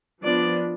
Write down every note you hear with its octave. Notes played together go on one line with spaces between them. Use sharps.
F3 B3 D4 D5